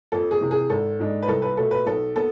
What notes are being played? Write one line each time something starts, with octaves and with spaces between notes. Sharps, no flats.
F2 A4
G#4
C3 E3
G#4
G#1 A4
G#2 G#3 D4
B4
C2 A4
B4
B2 A3 A4
B4
B1 A4
B3 A4